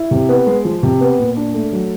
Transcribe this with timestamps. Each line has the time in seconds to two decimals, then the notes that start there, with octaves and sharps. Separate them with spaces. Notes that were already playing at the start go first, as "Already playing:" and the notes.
Already playing: E4
0.11 C3
0.29 B3
0.47 G#3
0.65 F3
0.83 C3
1.01 B3
1.19 A#2
1.37 D4
1.54 A3
1.72 F#3